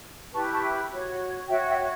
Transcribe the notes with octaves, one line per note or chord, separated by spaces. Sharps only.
E4 G4 B4 A5 C#6
A5 C#6
G5 B5
F#4 C#5
F#4 C#5 E5 G5
E5 G5